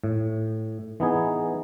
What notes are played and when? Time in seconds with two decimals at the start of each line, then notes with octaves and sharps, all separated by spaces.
0.04 A2
1.00 E3 B3 D#4 G#4